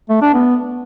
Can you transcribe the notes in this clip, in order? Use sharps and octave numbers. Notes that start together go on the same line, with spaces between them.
A3
D4
B3